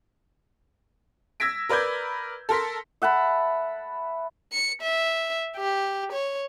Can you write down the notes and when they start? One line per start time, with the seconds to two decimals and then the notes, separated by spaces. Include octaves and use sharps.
1.40 E6 G#6 A#6 B6 D7
1.69 A#4 B4 D5 B5 G6 G#6
2.49 A4 A#4 C6 B6
3.02 E5 F#5 A5 B5
4.53 C#7
4.82 E5
5.57 G4
6.12 C#5